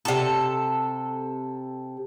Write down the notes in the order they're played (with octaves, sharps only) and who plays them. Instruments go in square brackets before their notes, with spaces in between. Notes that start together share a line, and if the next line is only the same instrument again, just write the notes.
[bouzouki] C3 A4